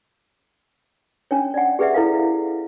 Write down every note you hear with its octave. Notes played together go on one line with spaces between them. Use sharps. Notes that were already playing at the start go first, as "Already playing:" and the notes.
C#4 D4 C#5
D5 F#5
G4 G#4 B4 D5 E5 F#5
E4 A4 B4 F5